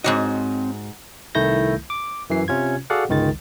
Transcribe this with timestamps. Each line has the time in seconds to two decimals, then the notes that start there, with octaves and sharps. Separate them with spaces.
0.04 G#2 D#3 C4 F#4 C#5 D#5
1.35 C2 D#3 A3 E4 G6 A#6
1.90 D6
2.30 F#2 E3 C7
2.48 C3 C#4 F4 G#6
2.90 F#4 G#4 A4 D5 F5 F#5
3.09 G1 C#2 D#3 G#3 A6